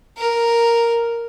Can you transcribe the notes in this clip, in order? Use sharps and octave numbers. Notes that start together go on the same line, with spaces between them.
A#4